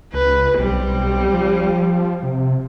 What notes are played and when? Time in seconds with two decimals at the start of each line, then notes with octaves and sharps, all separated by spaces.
0.14 C#2 B4
0.59 B1 G3 C4
1.34 F3
2.23 C3